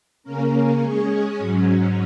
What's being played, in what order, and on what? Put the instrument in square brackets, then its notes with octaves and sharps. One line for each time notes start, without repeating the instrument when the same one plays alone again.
[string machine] C#3 A#3 C#4 A#4
G#3 C#4 G#4 C#5
G#2 F#3 C#4